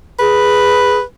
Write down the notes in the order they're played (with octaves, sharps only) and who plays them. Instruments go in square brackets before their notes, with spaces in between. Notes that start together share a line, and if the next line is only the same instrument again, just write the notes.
[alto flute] G#4 [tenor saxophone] B4